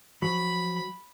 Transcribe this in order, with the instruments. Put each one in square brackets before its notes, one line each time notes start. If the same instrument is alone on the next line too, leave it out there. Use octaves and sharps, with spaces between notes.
[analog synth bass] F3 [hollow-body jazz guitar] F#3 [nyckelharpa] B5